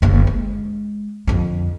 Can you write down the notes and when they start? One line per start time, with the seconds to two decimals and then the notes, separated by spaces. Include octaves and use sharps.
0.02 F#1 D3
0.27 G#3
1.27 F2 D3